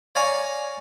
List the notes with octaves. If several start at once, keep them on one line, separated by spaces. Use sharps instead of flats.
C#5 D5 F5 G#5 A#5 C#6